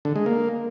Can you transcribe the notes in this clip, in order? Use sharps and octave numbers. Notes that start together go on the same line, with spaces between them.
D3
G#3
A#3